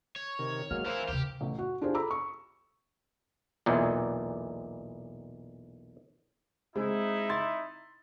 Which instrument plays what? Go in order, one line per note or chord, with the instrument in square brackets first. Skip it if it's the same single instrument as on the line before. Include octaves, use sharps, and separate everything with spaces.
[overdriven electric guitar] C#5
[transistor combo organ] C3 D#3 A#4
[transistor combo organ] F#3 G#3 A#3 [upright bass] B3 [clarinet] F6
[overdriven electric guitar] E3 E4 [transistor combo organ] A#4 C5 F5
[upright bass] D#2 C3 [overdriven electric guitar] G4
[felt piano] A1
F#4
D4 F4 G4 G#4 C5
A4 A#5 B5 D6 E6
C#6
[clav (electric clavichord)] B1 E2 A#2
[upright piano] G#3 C4 [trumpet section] D#4 E4
[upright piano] C6 A6